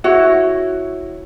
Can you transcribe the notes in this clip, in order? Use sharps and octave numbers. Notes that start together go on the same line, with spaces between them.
E4 F#4 C#5